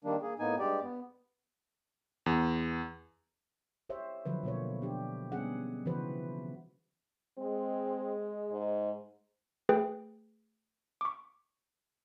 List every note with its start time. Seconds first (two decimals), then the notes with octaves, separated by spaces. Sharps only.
0.04 D#3 G3 A#3 D4
0.22 A#3 G#4
0.39 A2 A#3 B3 D#4 G#5
0.59 G2 G#3 G4 D5
0.82 B3
2.26 E2
3.89 G4 C5 C#5 E5
4.26 D3 F3 F#3 B4
4.43 B2 A#3 C5 C#5
4.82 D4 G4
5.32 G3 B3 C#4 G#4 F#5
5.85 C#3 E3 F3 F#4 B4 C5
7.38 G#3 C4
8.52 G#2
9.69 A3 G#4 B4 G5
11.01 C#6 D6